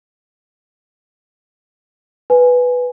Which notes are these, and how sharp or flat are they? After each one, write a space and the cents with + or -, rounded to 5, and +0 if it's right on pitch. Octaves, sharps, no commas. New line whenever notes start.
B4 +0 G#5 +0